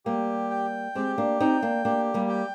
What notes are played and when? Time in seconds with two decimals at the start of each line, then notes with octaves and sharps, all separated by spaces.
0.06 G3 A#3 G4
0.51 G5
0.95 G#3 C4 G4
1.18 A#3 D4
1.40 C4 D#4 G5
1.63 A#3 D4
1.85 A#3 D4 G4
2.14 G3 A#3
2.29 G5